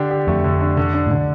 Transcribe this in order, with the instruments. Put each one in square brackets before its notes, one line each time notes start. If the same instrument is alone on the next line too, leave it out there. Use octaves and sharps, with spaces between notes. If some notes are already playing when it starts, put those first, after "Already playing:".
Already playing: [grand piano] D3 D4 G4
G4
[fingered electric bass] F2 [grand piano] A3
[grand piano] D3
D4
D3
D4
[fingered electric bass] A2 [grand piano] D3